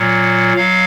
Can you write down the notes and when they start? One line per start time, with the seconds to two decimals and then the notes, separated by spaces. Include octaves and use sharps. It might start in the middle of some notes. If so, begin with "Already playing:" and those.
Already playing: A#2 F#3
0.56 F#3 F5